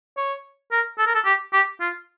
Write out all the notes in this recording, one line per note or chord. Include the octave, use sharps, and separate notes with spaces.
C#5
A#4
A4
A#4
A4
G4
G4
F4